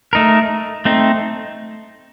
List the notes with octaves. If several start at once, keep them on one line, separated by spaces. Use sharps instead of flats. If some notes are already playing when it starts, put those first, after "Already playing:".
A3 D#4 A#4
A3 C4 D#4